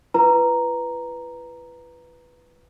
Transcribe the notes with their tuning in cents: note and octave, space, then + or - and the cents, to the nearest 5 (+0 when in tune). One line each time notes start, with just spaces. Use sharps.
E4 +45 B4 +0 A#5 +0